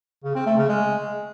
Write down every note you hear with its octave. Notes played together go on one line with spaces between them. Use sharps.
C#3
C4
A3
C#3
G#3